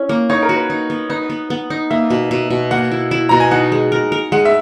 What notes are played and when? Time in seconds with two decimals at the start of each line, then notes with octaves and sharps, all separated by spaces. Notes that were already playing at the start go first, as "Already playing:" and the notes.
Already playing: C#4 E4
0.09 A#3
0.30 D#4 C#5
0.42 A#4
0.49 F#4
0.56 B4
0.70 D#4
0.90 B3
1.09 D#4 B4
1.30 B3
1.50 B3
1.70 D#4
1.90 A#3 E5
2.10 B2
2.31 B2
2.50 B2
2.71 A#3 F#5
2.91 E4
3.11 E4
3.29 B2 A#5
3.40 G#5
3.51 D#4 F#5
3.72 G#3
3.92 A#4
4.12 A#4
4.32 G#3 F#5
4.45 E5